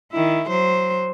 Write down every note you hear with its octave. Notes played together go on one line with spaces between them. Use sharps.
D#3 E4
F#3 C5